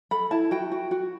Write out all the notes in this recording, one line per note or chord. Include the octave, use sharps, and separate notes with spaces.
A4 B5
E4 A5
F#4 G5
F#4
F#4